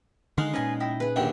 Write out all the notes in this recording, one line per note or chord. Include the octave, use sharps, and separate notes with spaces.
D3 D#3 G#3 D#4 F5 F#5
A#2 C#4 B4 D#5 G#5
E4 D#5 G5
G#4 B4
A#1 D#2 D3 G5